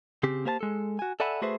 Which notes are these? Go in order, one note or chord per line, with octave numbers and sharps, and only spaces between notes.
C#3 C4 G4
A#3 G4 C5 G#5 A5
G#3 A4
F#4 G#5
A4 D5 E5 F#5 G#5 B5
A3 F#4 G#4 B4 C5 E5